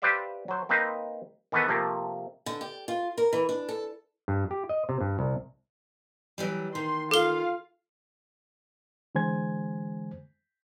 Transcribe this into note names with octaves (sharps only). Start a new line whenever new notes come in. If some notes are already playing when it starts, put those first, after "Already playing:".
G4 B4 C5 D5 E5 F5
F#3 C5
A#3 C4 D#4 B4 C5
D#3 E3 B3 A4 B4
C3 F3 A3 A#3
D3
G4
F4
A#4
E3
D4
A4
G2
G4
D#5
C3
G2
C2
E3 F#3 G3
D#3 C6
F4 A4 F5 G7
D3 E3 G#3 C5 G#5 G#6